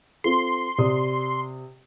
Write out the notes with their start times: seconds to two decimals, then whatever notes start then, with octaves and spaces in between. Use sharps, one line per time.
0.24 C4 F4 A4 C6
0.78 C3 D5 D#6